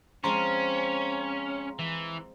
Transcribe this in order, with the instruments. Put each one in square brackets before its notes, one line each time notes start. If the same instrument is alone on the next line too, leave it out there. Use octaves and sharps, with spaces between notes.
[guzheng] F3 G#3 C4 [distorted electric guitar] C#4 [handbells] A#5 C6
[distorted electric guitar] E3